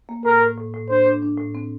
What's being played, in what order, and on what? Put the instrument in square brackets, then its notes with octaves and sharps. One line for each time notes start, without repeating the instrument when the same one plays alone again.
[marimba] A#3
[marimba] A2 [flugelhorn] A#4
[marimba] A2
A2
A2
[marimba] D4 [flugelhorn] C5
[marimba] D4
D4
A2
C4